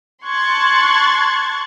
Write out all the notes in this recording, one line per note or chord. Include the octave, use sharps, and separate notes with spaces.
A5 C6 C#6 F#6 G#6 A6